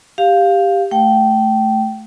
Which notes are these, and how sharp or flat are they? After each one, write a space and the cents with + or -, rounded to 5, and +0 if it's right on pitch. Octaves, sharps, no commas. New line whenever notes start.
G4 +10 F5 +0
A3 -5 G5 -20